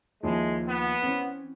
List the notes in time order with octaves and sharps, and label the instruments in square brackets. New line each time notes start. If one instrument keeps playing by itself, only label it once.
[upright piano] D#2 F3 E4 [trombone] G#3
[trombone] B3
[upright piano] E3 C4 C#4